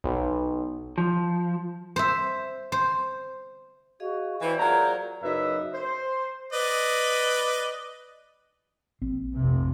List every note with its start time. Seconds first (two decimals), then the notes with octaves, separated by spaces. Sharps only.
0.04 B1
0.98 F3
1.96 C5 E5
2.72 C5
4.00 F#4 G#4 D#5 F5
4.41 E3 C5 D5 G5
4.59 F#3 A#3 F4 G#4 A#4 D5 A#5
5.23 F#2 C#3 D#4 E4 B4 E5
5.75 C5
6.53 B4 D5 D#5
9.02 A#1 C4
9.35 F1 C3